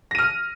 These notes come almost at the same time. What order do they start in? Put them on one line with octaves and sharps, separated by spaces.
A#6 D#7 F6